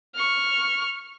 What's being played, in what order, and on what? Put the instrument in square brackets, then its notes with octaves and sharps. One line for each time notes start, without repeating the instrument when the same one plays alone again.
[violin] C#6 F6